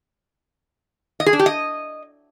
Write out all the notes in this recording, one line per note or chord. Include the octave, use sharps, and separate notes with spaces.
D#5
G#4
D4
G4
D#5